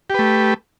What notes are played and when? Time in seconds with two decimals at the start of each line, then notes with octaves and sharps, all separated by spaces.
0.10 G4
0.14 B4
0.19 A3